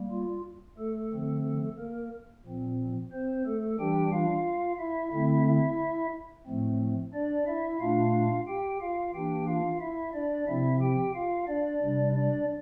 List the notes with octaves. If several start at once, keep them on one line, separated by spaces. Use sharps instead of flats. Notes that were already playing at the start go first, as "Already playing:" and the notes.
Already playing: G3 A#3
F4
A3 A4
D3 F3 C4
A#3 A#4
A#2 F3 C4
C4 C5
A3 A4
E3 G3 D4 G4 G5
F4 F5
E4 E5
D3 A3 C4 E4 E5
E4 E5
A2 F3 A3 C4
D4 D5
E4 E5
A#2 A3 D4 F4 F5
G4 G5
F4 F5
E3 A#3 D4 G4 G5
F4 F5
E4 E5
D4 D5
C3 F3 C4 E4 E5
G4 G5
F4 F5
D4 D5
C3 G3 D4
D4 D5